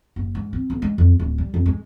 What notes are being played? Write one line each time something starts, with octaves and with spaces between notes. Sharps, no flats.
F#1
G#2
C4
B1
G#3
F2
D1
G3
F2
G#3